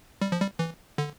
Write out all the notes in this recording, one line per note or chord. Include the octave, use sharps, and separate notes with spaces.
G3
F3
G3
E3
D3